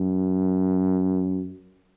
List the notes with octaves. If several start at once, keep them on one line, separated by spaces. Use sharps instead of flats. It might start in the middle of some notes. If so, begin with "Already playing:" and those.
Already playing: F#2